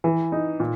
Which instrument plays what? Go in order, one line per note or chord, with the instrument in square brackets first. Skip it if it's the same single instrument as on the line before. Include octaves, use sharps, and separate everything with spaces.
[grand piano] E3
D#4
A#2